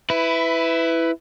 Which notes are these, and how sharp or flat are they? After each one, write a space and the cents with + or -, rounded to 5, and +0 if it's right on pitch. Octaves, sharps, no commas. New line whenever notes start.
E4 +0 B4 +20